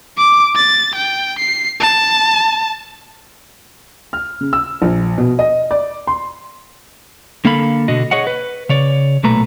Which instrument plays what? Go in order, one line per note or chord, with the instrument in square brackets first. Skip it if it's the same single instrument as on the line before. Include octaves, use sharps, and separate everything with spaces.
[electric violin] D6
A6
G5
C7
A5
[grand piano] F6
C#3
E6
A#1
B2
D#5
D5
C6
[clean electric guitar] D3 A#3 A4 F5 B5
B2 D3 F#4 D#5
G#4 C#5 D#5 F#5
B4
C#3 C#5 D5
B1 A#2 A3 B4 A#5